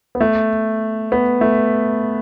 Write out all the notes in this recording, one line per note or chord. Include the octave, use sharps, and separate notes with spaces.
B3
A3
B3
A3